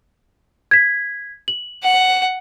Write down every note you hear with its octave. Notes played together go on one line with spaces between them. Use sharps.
G#6 B6
F#7
F#5